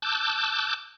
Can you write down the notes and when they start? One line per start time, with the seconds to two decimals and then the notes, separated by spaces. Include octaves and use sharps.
0.02 A5 D6 E6 F#6 G6